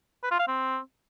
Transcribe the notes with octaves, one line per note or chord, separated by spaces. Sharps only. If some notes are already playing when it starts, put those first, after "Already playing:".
B4
F4
F5
C4